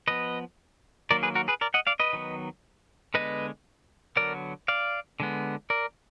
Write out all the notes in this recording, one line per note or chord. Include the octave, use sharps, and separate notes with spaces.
F3 B3 B4 D#5
D#3 F#3 A#3 A#4 D5
G#4 B4
F#4 A#4
G#4 B4
A#4 D5
D#5 F#5
D5 F5
B4 D#5
D#3 F#3 B3
D3 G#3 B3 B4 D#5
D3 F#3 B3 A#4 D5
D5 F5
D3 G#3 B3
A#4 D5